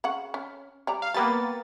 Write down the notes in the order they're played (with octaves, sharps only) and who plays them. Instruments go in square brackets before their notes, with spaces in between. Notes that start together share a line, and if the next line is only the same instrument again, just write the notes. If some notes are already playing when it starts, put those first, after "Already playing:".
[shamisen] C#3 F#4 F#5
C#4
G3 D5 A#5
[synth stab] F5
[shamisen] G3 G4 B4 [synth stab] A#3 B3 A6